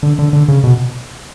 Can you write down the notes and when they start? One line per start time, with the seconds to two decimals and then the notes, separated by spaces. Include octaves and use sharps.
0.03 D3
0.19 D3
0.33 D3
0.48 C#3
0.64 B2